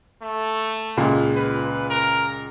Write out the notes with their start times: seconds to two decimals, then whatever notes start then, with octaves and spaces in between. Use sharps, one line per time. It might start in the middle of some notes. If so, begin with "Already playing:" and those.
0.22 A3
0.97 C#2 A#2 G#3
1.36 B4
1.90 A#4